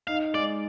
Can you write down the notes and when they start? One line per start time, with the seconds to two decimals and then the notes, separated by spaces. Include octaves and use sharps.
0.07 D#4 F5
0.34 G#3 D5